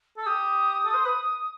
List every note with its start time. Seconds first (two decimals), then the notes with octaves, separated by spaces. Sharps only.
0.17 A4 E6
0.26 G4 D#6
0.86 A4
0.94 C5
1.05 B4